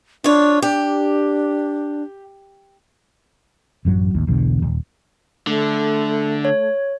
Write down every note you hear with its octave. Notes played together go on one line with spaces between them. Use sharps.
D4 F4 C#5
D4 G4
A1 F#2 F#3
A1 D#2
B1 E2 B2 D3
D#1
D3 A3
C#5